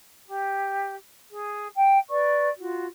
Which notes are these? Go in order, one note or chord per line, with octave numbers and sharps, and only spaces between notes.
G4
G#4
G5
B4 D5 C#6
F4 F#4